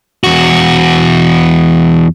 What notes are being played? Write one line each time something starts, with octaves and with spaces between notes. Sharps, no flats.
E2 F#4